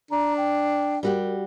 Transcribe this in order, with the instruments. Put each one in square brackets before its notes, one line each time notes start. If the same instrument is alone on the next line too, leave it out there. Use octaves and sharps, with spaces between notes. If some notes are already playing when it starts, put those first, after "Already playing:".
[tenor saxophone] D4 [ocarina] A#5
[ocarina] G5
[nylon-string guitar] G3 F#4 G4 [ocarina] A#4